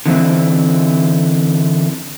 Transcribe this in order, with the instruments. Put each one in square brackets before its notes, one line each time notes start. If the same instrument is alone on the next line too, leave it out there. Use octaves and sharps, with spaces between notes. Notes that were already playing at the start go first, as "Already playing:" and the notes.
[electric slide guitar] D3 E3 C4